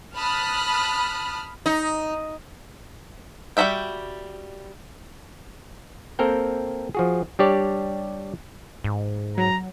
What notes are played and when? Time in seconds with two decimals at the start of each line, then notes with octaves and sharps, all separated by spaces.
0.15 A5 B5 D#6 F6 F#6
1.66 D#4
3.57 G3 F#4 C5 E5 G5
6.19 A#3 C4 A4 A#4 G5
6.95 F3 F#4 G#4
7.39 G3 D4 G4 C#5 D5
8.84 G#2
9.38 F#3 A#5